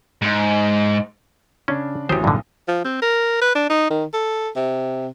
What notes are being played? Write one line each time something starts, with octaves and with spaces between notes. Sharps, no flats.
G#2
C#3 C#4 D4
A1 F#3 G4 C5 D#6
B1 G2 A#2 D3
F3
C4
A#4
B4
D4
D#4
D#3
A4
C3